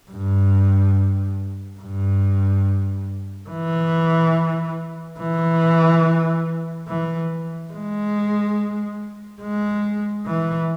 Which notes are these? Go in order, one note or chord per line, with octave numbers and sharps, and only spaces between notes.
G2
G2
E3
E3
E3
G#3
G#3
E3